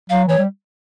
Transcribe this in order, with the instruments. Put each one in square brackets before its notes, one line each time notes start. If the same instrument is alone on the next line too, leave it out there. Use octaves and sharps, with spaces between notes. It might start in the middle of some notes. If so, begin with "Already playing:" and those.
[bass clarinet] F#3 [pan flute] F5
[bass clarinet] E3 [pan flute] C#5
[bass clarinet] G3